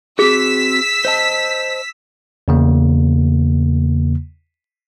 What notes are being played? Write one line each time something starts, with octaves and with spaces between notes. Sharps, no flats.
C4 F#4 G#4 E6 B6
C5 D#5 A5
E2 C#3 A#3